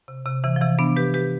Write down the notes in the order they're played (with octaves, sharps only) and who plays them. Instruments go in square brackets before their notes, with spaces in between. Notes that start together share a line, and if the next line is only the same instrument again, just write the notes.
[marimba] C3
C3
C3 E3
F3
C3 E3
B3 D4
G4 B4
G4 B4